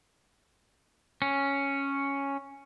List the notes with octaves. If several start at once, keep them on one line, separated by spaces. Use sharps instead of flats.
C#4